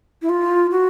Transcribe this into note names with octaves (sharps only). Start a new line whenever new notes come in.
E4
F4
F#4